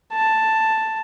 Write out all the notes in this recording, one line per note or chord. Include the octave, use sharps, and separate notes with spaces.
A5